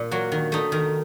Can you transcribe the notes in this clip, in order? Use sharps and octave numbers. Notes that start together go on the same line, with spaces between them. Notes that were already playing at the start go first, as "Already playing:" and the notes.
Already playing: A#2
F#3 A#3 F#4
D#3
A3 D#4
D#3